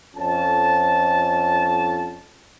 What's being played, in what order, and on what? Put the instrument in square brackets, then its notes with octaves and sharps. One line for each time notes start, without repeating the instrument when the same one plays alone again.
[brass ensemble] F2 C#4 A5